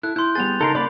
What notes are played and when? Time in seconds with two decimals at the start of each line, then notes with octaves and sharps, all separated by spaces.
0.03 E4 A4 F#6
0.16 E4 C6 G6
0.35 G3 B3 G#4 A6 F7
0.61 C#3 D#4 A4 A#4 C6
0.75 C#3 A#3 D5 B5 D6